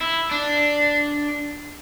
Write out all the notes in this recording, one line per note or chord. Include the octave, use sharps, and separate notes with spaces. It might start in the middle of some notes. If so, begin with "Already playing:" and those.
E4
D4